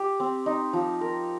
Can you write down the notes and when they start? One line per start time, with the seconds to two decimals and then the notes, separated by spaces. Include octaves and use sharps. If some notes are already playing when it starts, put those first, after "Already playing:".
Already playing: G4
0.20 C4
0.46 D#4
0.73 F3
1.01 A#4